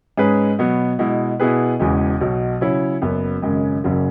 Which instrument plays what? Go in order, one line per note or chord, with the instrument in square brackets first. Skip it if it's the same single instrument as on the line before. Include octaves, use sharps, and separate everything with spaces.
[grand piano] G#2 G#3 C#4 G#4 B4
B2 F#3 B3
B2 G#3 E4
B2 B3 E4 G#4 B4
E1 E2 C#3 E3 G#3
B1 B2 F#3
C#3 F#3 E4 C#5
F#1 F#2 F#3 B3
G#1 F#2 C#3 G#3
F#1 F#2 C#3 F#3